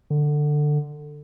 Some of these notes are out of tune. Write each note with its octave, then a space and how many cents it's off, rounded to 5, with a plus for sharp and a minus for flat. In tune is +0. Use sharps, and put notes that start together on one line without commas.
D3 +15